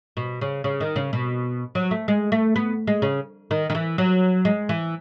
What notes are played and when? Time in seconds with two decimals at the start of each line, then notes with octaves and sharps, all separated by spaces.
0.17 B2
0.41 C#3
0.64 C#3
0.80 D#3
0.96 C#3
1.13 B2
1.75 F#3
1.91 A3
2.08 G#3
2.32 A3
2.56 B3
2.87 G#3
3.02 C#3
3.51 D#3
3.70 D#3
3.75 E3
3.98 F#3
4.45 G#3
4.69 E3